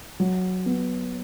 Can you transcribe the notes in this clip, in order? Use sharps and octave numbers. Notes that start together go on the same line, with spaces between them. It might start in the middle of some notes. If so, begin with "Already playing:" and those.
F#3
B3